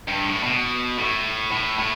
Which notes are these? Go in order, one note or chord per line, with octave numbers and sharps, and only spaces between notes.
G2
A2
B2
A2
A2
A2